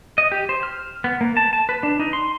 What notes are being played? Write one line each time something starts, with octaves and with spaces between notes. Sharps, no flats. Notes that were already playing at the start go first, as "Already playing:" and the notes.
D#5
G4
C5
F6
B3
A#3
A5
A5
B4
D4
D#4
C6